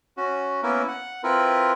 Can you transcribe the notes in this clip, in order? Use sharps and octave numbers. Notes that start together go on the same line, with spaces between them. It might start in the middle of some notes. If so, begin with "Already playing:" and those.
C#4 F#4
A#3 B3 C#4 E4 A#4
F#5
C4 E4 F4 A#4 B4